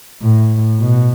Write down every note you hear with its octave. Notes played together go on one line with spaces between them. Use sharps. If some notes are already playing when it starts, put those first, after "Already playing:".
A2
B2